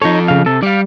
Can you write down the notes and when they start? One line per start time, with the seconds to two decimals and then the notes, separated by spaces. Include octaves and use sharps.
0.02 F3 D#4 A4 C#5
0.28 C#3 F5
0.46 C3 A4
0.63 G3 D5 F5